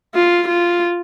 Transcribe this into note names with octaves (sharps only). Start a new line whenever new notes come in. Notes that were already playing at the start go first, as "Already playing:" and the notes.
F4
F4